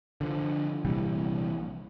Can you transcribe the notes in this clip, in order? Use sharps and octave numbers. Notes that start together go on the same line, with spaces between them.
D3 F3
A#1 C3 E3 G3